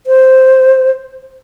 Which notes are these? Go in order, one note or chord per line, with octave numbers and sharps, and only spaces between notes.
C5